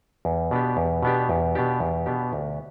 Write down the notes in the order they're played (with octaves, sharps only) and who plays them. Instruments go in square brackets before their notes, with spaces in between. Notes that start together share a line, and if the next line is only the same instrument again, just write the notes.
[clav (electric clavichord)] E2
B2 B3 D4 G4
E2
B2 B3 D4 G4
E2
B2 B3 D4 G4
E2
B2 B3 D4 G4
D2